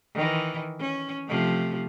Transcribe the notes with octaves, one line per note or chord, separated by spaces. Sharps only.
D#3 E3
C#4
C3 F3 A3